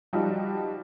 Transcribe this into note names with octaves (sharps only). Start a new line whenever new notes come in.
F3 G3 D#4 F#4 G4